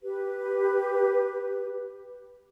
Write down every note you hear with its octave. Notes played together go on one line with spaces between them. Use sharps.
G4 B4